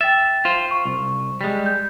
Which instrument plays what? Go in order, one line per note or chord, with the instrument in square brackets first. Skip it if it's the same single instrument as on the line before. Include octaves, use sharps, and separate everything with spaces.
[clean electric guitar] E5 [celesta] G5 A6
[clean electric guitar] F4 C5
[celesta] C#6
[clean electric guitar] C2
G3 G#3
[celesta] G6